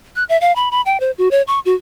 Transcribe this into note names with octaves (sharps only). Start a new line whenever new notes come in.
F#6
E5
F5
B5
B5
G5
C5
F#4
C#5
C#6
F#4